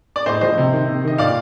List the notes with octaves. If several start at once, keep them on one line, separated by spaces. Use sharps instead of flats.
D5
A2 C5 D#5
F3 C5 D#5
C3
D#3
C3
D#3 D#5
A#2 D5 F5